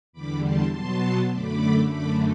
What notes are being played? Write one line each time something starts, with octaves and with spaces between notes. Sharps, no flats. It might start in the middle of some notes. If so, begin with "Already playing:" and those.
E2 D3 G3 B5 D6
A5 C6
B2 F#3 B3 A5 C6
F#2 D3 A3 B5 D6
F#2 D3 A3 B5 D6